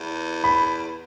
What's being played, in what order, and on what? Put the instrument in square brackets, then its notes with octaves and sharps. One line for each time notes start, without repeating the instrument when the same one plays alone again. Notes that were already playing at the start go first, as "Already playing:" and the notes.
Already playing: [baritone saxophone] E2
[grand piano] B5